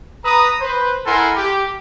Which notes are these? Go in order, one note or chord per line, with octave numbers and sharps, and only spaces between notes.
B4 A#5 D#6
B4 C5
E4 A4 A#4 F#5 G#5 C6
G4